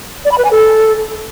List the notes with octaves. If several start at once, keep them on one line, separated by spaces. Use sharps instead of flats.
D5
B5
B4
G#5
A4